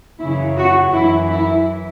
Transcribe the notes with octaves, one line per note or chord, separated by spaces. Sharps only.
F#2 C#3 E3 E4
F#4
F#2 E3 E4
E4